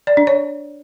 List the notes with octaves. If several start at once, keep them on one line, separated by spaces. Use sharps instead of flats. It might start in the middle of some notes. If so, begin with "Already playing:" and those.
D5
D4
C#5